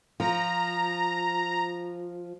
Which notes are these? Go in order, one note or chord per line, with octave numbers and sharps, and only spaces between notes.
F3 A#5